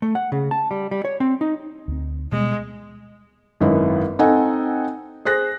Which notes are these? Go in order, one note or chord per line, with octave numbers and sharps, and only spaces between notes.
A3
F#5
C#3
A5
G3
G3
C#5
C4
D#4
D2 C4
B2 G3 G#3 B3
G#1 F#2 D#3 E4 B4 D#5
C4 D#4 A4 D#5 F#5 G#5
G#4 C5 F#6 A#6